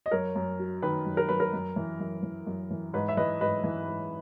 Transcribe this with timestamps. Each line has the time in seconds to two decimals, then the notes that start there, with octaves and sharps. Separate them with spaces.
0.06 D#5
0.11 F#2 A#4 C#5
0.35 F#2
0.59 F#3
0.82 D#3 B4
1.06 F#2
1.17 A#4
1.29 F#2 B4
1.40 A#4
1.53 F#2
1.76 E3
2.00 F#2
2.23 E3
2.46 F#2
2.71 E3
2.93 G#2 B4
3.08 E5
3.17 E3 B4 D#5
3.41 G#2 B4 D#5
3.64 E3
3.87 G#2